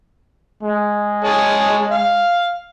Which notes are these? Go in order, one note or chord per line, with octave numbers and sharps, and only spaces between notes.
G#3
G#4 C#5 A5
F5